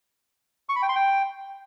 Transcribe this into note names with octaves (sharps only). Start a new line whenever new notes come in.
C#6
B5
G5
C6
G5